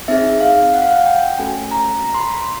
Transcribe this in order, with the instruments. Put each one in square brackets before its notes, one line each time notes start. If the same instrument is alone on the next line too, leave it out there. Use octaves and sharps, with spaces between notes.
[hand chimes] C4 D#4 G#4 E5
F5
F#5
F5
F#5
G5
A3 C#4 F#4 A4 G#5
A#5
A#5
C6
B5
C6